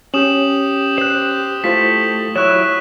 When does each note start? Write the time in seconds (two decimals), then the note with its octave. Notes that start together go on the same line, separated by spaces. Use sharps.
0.14 C#4 G4 D#6 E7 F#7
0.98 C5 F#6 E7
1.64 A3 E4 F4 C5 B6
2.36 F#3 E4 C#5 C#6 F#6 E7